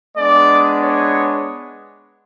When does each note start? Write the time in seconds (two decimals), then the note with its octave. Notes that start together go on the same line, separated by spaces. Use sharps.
0.17 G#3 B3 D4 D5
0.82 C#5